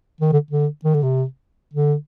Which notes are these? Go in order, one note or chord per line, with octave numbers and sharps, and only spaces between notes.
D#3
D3
D3
D#3
D3
C3
D3